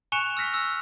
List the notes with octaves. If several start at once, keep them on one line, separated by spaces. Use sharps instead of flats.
G#5 C#6 F#6 C#7 E7 F7
E6 F6 A#6 B6
E6